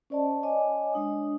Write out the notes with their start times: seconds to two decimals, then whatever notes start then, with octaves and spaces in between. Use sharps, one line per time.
0.10 C#4 C5 D5 D#5 A5
0.43 C#5 D#5 G#5 D6
0.94 G#3 D4 D#6